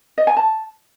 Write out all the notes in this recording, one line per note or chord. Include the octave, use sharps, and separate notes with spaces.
D#5
G#5
A5